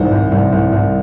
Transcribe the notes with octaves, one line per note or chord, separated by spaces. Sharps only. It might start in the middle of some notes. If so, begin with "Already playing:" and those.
Already playing: C2 D#3 C5
C2
C2
C2
C2